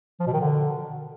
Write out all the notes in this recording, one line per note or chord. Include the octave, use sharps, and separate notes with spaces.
F3
B2
D#3
D3